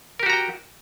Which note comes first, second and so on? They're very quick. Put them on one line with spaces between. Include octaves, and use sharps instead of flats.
A#4 G4 F#4 A#5 G5